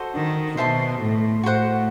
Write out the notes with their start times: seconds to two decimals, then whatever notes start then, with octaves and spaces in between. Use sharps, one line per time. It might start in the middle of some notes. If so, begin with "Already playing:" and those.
Already playing: F#4 A4 C5 D#5
0.14 D#3
0.57 B2 C5 E5 A5 C6
1.01 A2
1.44 A2 F#4 C5 F#5